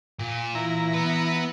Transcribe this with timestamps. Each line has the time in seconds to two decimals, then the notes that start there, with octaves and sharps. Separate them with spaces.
0.20 A#2
0.55 E3 E4 A#5
0.93 B3 B4